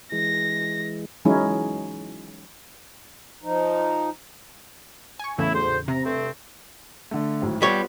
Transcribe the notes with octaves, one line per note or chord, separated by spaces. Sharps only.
E3 G#3 A#6
E3 F#3 G#3 C#4 D#4 E4
F3 D#4
G#5 C#6
E2 A2 C#3 A3 E4
D2 G#2 C5
C3 A#5
G2 A3 C4
D3 A3
G#1 A2 F#3
G3 B3 F4 C#5